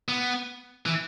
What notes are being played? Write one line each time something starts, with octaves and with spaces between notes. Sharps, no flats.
B3
E3